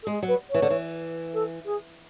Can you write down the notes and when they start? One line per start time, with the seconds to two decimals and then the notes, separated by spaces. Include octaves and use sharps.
0.02 A4
0.06 G#3 G#4
0.22 F#3 B4
0.49 C#5
0.54 E3
0.62 D3
0.70 E3
1.33 A4
1.65 G#4